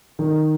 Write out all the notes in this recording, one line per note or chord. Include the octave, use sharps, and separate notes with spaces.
D#3